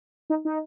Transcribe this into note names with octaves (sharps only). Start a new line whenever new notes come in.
D#4
D#4